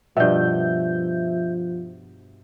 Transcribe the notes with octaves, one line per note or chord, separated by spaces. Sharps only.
G2 B2 F3 E5 G6